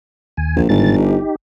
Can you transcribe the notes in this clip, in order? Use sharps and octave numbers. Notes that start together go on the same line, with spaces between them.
D#2 G#5
A#1
G1 G#2 D#3 A6
D#4 G4